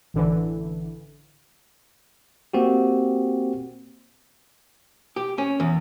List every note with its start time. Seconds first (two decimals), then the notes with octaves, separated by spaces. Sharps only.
0.14 A1 D3 E3
2.53 A#3 C4 F#4 G4
5.16 G4
5.38 C#4
5.60 E2